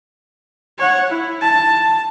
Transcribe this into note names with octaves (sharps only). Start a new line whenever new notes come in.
C#5 F#5
E4
A5